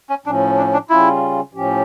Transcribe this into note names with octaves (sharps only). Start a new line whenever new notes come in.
C#4
A2 F3 C#4 D4
D4
D4
C#3 G3 C#4 E4 F4
A2 F3 C#4 G4